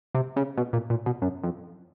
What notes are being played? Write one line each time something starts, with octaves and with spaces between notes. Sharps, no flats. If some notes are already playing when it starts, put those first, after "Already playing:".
C3
C#3
B2
A#2
A#2
B2
F#2
F2